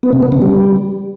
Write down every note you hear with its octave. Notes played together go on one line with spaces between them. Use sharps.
B3
C3
B3
C#3
G3